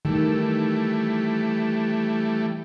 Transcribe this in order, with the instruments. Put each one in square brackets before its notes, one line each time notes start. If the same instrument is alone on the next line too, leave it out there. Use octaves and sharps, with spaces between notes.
[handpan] D#3 [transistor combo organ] E3 G3 A3